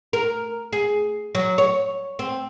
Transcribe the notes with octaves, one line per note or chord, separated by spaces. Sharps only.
A#4
G#4
F#3
C#5
C4